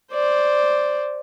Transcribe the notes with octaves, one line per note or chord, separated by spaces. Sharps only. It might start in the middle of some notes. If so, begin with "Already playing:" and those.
C5 D5